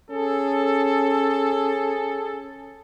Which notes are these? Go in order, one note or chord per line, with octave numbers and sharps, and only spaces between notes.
C#4 G#4 A4